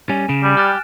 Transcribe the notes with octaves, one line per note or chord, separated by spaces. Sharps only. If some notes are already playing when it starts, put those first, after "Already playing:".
G3 C#4 G#5
C#3 D7 E7
G3
G4 F6 F#6 A6